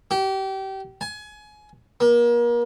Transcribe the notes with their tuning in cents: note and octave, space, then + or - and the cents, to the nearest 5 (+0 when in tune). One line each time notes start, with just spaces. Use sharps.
G4 -30
G#5 +25
A#3 +35